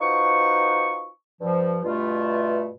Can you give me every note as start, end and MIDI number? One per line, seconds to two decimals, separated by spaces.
0.01 1.08 63
0.01 1.08 65
0.01 1.08 66
0.01 1.08 71
0.01 1.08 72
0.01 1.08 85
1.41 1.79 43
1.41 1.79 53
1.84 2.70 43
1.84 2.70 47
1.84 2.70 57
1.84 2.70 65